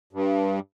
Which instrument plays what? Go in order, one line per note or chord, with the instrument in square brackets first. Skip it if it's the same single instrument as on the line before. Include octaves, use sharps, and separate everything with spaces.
[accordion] G2